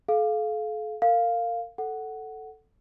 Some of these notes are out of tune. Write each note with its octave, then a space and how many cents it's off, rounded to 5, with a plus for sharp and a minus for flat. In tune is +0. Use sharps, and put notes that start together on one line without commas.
A4 -40 F5 +0
A#4 -35 F5 +0
A4 +0 F#5 +5